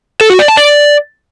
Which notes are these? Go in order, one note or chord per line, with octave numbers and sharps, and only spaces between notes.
A4
F#4
D5
A5
D5